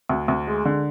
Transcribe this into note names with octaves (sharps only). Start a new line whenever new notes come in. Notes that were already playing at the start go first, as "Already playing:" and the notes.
D2
D2
G#3
D3